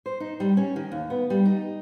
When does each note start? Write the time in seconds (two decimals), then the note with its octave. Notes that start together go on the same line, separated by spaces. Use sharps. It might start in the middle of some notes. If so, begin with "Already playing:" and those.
0.06 C5
0.20 D#4
0.40 G3
0.57 C#4
0.76 D#3
0.91 D#2
1.10 B3
1.30 G3
1.45 D#4